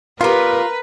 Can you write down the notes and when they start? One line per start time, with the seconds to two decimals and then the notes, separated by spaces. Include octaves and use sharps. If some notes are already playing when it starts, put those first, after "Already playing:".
0.21 G3 B3 F4 A#4 B4